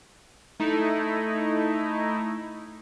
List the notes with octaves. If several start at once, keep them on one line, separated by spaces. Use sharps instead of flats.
A3 D#4 E4